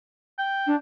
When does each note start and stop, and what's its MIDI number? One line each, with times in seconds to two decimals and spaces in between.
0.38 0.73 79
0.66 0.75 62